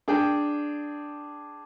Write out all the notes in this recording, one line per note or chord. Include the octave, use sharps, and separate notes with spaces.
D4 G#4 G5